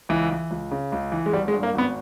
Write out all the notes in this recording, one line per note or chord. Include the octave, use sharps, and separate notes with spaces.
C#2 E3
E3
C#2
C#3
C#2
E3
G#3
G#1 G3
G#3
G2
A#3
G#1 B3